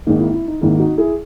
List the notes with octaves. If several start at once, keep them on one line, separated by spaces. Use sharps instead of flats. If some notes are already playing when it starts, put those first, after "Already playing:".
G#1 G#2 D#3 A#3 D#4
E4
E4
D#4
G#1 G#2 D#3 A#3 E4
D#4 F#4
E4 G#4